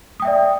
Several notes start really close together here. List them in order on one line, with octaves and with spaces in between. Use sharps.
D#6 G5 E5 D5